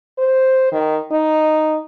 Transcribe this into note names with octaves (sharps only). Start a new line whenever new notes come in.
C5
D#3
D#4